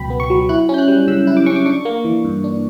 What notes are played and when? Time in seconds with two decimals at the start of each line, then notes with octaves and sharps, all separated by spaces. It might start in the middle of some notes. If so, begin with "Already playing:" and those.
Already playing: C#2 B2 F#3 B3 G5 B5
0.10 B3
0.20 C#6
0.30 F#3
0.49 E4 F#6
0.69 C#4
0.74 G6
0.78 F#6
0.88 G3
1.08 C#3 E6
1.27 E4
1.37 D6
1.46 C#4 C#6
1.56 D6
1.66 D4 C#6
1.85 A#3
2.05 E3
2.25 G2
2.44 D4